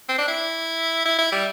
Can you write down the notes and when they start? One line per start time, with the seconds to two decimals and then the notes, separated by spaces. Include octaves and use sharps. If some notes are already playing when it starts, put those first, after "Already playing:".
0.09 C4
0.18 D4
0.28 E4
1.06 E4
1.18 E4
1.32 G3